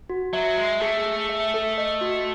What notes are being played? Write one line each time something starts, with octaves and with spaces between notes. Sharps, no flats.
F#4
F#3 E5
G#3 E5
A3 G#4
G#4
E5
A4
D#5
F#4